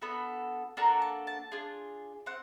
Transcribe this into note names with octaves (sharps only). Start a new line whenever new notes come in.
B3 D4 F#4 A4 B5
A#3 D4 F#4 A4 A#5
A5
A5
D4 F4 G#4
C4 F#5